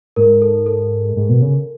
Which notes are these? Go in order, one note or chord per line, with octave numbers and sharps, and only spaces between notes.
G#2 A#4
A4
A4
G#2
B2
C#3